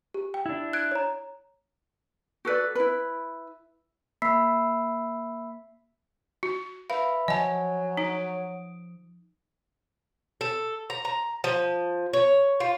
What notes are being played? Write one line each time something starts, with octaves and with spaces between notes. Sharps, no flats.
G4
G5
D4 E4
F#6 G#6 D7
C#5 A#5
F#4 A4 B4 D5
E4 B4
A#3 E5 B5 E6 B6 C7
F#4
B4 E5 F5 B5
F3 F#3 D#5 G#5 A5
D#4 D#6 D7
A4
A#5
A#5
F3
C#5
F4